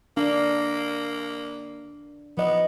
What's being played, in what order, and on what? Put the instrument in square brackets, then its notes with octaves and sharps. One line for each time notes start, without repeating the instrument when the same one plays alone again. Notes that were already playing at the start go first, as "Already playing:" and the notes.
[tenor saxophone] A#3 [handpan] D4
[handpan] F3 D#5 [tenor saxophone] B3